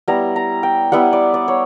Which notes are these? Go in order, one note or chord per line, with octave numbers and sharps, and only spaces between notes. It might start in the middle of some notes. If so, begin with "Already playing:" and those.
G3 B3 E4 A#5
A#5
G5
G3 B3 E4 F#5
D5
D5
C#5